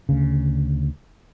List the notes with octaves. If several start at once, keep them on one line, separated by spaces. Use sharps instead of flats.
D2 C#3